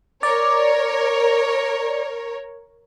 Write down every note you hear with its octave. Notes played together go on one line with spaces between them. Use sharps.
A#4 C#5 D5